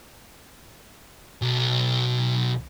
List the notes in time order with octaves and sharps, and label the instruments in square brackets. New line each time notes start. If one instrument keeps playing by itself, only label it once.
[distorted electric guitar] B1